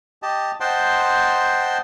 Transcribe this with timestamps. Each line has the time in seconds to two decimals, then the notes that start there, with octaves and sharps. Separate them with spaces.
0.22 G4 D#5 A5
0.60 C5 D#5 F#5 G5 A5 C6